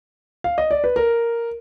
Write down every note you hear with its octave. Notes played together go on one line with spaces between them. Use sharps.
F5
D#5
D5
B4
A#4